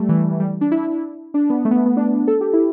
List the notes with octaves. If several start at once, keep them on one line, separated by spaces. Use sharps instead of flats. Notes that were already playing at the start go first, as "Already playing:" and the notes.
Already playing: G3 A3
E3
G3
D4
E4
D4
B3
A3
B3
A3
B3
D4
A4
G4
E4